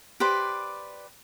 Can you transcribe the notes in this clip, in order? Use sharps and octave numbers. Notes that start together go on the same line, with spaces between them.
G4 B4 C5 D5